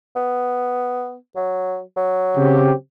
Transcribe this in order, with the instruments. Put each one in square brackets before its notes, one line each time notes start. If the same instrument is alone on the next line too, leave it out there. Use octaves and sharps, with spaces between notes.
[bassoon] B3
F#3
F#3
[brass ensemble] C#3 C4 G4